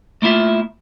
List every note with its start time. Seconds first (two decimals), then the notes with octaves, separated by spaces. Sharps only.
0.22 A3 A#3 E4 F4 E5